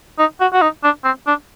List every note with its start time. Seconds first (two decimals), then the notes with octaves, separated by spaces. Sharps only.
0.19 D#4
0.40 F#4
0.53 F#4
0.62 D#4
0.84 D4
1.05 C4
1.27 D4